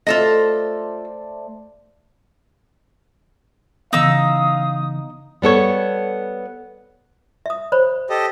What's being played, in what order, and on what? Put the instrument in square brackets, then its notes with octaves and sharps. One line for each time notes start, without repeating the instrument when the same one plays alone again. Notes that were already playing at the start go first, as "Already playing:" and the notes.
[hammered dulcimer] A3 C5 D5 [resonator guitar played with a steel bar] F4 A4 D#5
[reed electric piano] C#3 E3 B3 [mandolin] D#4 E6 [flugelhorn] F5 [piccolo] D#6
[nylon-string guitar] G3 B3 A4 C#5
[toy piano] E5 D#6
C5 C#5 B5
[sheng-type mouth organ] G4 A4 D#5